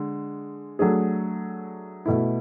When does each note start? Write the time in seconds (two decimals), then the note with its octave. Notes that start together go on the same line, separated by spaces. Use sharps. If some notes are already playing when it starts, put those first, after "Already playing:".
Already playing: D3 G#3
0.79 F#3 A3 D4 G#4
2.06 B2 A3 E4